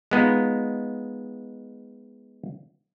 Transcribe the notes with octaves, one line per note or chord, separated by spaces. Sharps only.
G#3 B3 D#4 F4